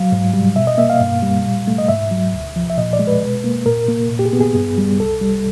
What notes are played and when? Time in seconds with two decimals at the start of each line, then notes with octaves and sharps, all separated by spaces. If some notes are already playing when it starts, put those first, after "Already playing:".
Already playing: F#3 F5
0.12 G#2
0.34 G3
0.56 B2 E5
0.67 D#5
0.78 A#3 E5
0.90 F5
1.01 G2
1.23 G3
1.45 A#2
1.67 A3
1.78 D#5
1.88 G#2 E5
2.11 F#3
2.33 D2
2.56 F3
2.70 E5
2.78 A#2 D#5
2.93 D5
2.99 G#3
3.07 B4
3.22 B2
3.44 A#3
3.66 A#2 A#4
3.88 A#3
4.10 A#2
4.19 G4
4.25 G#4
4.33 B3
4.41 G#4
4.55 G2
4.78 G3
4.99 C2 A4
5.21 G3